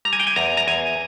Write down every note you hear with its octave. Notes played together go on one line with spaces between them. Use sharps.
G3 A#5
G#5
G5
G#5
E2 A#5
A#5
E2 G#5